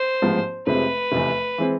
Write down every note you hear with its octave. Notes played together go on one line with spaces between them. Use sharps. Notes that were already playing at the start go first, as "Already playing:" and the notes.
Already playing: C5
A1 G#2 F3 G#3 B3
F1 F2 C3 G#3 C4 B4
F1 E2 C3
E3 G#3 C4